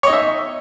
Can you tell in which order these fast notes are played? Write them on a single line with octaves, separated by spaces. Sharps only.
C#5 D#5 D#4 E5